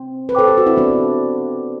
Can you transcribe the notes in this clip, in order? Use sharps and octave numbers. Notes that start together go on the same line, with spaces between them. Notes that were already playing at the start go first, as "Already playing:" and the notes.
Already playing: C4
B4
A4 C5 G5 D6
G4
F#4
C4 E4
B3 D4